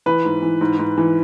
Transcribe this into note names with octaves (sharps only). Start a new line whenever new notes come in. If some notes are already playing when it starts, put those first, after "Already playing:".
E3 B4
G#2
E3
G#2
G#2
E3